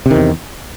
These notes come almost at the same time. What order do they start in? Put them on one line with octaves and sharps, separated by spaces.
C3 D#3 E2